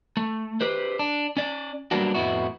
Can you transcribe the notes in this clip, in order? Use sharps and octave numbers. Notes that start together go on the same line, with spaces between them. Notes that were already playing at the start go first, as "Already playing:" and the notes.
A3
G4 B4 C5
D4
C#4 D5
F#3 G3 A#3 B3 D4 F#4
F2 A2 B3 E4 F#4